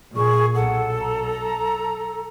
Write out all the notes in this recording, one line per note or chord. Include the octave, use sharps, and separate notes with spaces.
A#2 G#4 C#6
B1 A4 F#5
A#5